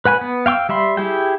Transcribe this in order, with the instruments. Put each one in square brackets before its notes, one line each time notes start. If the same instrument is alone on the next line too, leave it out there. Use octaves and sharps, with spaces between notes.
[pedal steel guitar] B4 F#5 G#5 B5
B3
F5 G5 C#6 E6
G3 E5 B5 C6
E4 G4 G#4 G5